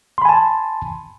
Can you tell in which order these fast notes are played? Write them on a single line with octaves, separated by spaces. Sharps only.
C6 B5 G#5 A5